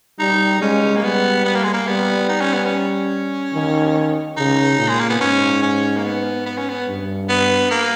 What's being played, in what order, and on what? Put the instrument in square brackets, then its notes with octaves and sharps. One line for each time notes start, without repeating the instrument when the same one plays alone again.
[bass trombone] G3 [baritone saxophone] D#4
[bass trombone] G#3 [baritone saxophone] C#4
[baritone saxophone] A#3
[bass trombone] G3 [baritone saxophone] B3
[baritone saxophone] B3
A#3
G#3
A#3
[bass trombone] G3 [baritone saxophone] B3
[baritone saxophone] D#4
C#4
B3
C#4
[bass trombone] D#3
[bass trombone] C#3 [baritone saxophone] D#4
[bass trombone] A#2
[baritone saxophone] G#3
A#3
B3
[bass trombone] G#2 [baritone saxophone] C#4
[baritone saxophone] C#4
A#3
B3
B3
C#4
B3
[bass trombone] G2
[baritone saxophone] B3
A#3